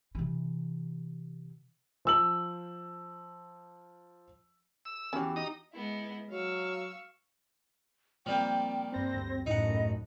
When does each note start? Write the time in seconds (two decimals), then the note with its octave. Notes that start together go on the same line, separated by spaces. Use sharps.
0.15 C3 E3
2.05 F3 E6 F#7
4.85 E6
5.13 E2 E3 C#4 F#4 G4 F#5
5.36 D#4 A#5 D#6
5.73 G#3 B3 E4
6.30 F#3 F5 C#6 E6
8.26 A#2 F3 G3 A#3 C4 G5
8.92 G2 C4 B4 C5 A#6
9.14 D2 G2
9.46 F#2 A2 D#4 E4 D#5 F#5